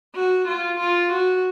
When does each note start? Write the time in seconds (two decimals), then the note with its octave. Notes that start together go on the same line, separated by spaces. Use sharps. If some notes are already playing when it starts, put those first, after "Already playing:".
0.15 F#4
0.48 F4
0.80 F4
1.12 F#4